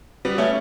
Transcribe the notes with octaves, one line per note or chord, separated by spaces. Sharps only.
G3 B3
A3 C#4